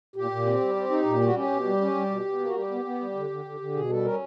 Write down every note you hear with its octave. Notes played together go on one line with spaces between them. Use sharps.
A#2 G4
A#2
C4
G3
C4
D#4
A#2
G3 F#4
C#4 G4
B2
G3
C#4
G3
B2
B2
A#3
F#4
G3 G4
B3
B3
G3
D3
D3
D3
D3
B2 G#4
G3 A4
C#4 A#4